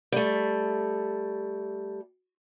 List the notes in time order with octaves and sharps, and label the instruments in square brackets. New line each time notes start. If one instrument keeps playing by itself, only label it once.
[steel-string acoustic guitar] G3 A3